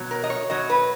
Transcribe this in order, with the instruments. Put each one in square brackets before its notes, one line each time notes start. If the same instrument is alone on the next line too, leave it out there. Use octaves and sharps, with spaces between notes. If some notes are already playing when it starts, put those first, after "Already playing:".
Already playing: [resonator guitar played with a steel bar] B2 F#3
A#4
D#5
C#5
B2 F#3 D#5
B4